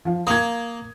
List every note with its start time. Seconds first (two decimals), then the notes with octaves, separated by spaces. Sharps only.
0.05 F3 F5
0.27 A#3 D#6 G#6